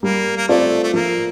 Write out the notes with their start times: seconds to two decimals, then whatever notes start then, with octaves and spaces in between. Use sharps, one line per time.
0.03 G3 A#3
0.37 A#3
0.48 A3 C4 F4 A4 D5
0.83 A3
0.94 F3 A#3